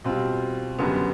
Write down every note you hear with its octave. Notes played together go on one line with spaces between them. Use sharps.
B2 G3 C4 F4
F#1 F#2 D3 G3 B3